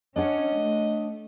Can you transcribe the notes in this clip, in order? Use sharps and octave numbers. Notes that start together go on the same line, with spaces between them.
C#4 D4 C#5 D#5 F#5
A3